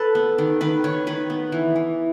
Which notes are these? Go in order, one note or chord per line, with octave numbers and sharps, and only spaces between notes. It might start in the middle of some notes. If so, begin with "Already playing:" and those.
Already playing: A4 B4
B3
D#3
D#3 B4
D#3 C#5
D#3 B4
B3
E3
E3